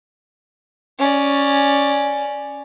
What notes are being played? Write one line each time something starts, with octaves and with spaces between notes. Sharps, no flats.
C#4 D5